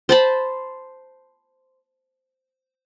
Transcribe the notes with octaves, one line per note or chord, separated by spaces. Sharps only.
C5 A5 B5